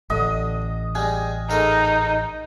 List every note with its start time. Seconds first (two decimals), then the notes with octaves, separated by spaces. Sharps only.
0.10 A1 D3 D#5
0.95 G3 G#3 G#5
1.50 G#2 A3 D#4 A#4